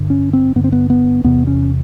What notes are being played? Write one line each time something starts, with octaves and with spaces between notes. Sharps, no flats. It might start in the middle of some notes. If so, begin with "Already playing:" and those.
Already playing: G2 D3
C#4
C4
G2 D3 B3
C4
B3
B3
E2 C3 B3
C#4